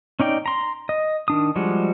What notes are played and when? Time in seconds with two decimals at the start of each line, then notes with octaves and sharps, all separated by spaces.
0.20 C#4 D#4 D5 G5
0.46 A#5 C6
0.89 D#5
1.28 D#3 D4 D#6
1.56 F3 G3 G#3 F#4